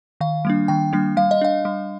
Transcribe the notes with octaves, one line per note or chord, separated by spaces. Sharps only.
D#3 F5
G3 A#3 D4
D#3 G5
G3 A#3 D4
G3 F5
D#5
D4 F5
G3